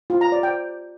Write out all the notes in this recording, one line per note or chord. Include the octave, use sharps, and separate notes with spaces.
F4
A#5
D5
G5